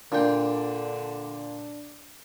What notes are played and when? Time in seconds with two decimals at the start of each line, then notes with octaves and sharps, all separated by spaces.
0.12 A#2 D3 D4 G5